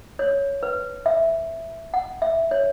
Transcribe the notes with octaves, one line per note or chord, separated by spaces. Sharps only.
C#5
B4
E5
F#5
E5
C#5